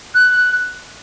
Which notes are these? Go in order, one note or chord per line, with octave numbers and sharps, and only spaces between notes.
F#6